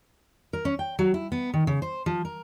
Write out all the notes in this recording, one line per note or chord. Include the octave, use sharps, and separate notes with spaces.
A#4
C#4
G5
F#3
E4
B3
D#3
C#3
C5
F3
A#4